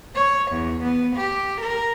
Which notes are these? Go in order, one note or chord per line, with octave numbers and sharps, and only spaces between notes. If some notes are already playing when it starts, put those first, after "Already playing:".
C#5
E2
B3
G4
A#4